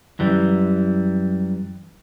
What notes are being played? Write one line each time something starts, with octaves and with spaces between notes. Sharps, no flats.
F#2 E3 G3